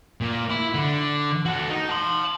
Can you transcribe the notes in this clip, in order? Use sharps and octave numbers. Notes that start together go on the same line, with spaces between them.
A#2
E4
D3
F#4 A4
D#4
A5 C6